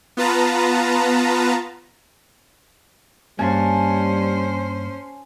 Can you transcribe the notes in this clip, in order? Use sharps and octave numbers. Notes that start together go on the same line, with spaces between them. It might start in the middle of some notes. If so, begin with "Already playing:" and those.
B3 F4 B4 A5 A#5
G2 G3 A#3 C#4 C5 G#5 A5